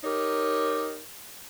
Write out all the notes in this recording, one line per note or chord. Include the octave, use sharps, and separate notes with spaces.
D#4 G4 A#4 C#5